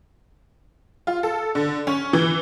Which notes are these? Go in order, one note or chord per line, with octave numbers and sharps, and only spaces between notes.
F4
A4
D3
C#4
E3